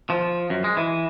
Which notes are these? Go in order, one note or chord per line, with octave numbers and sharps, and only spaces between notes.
F3
F#2
G#3
E3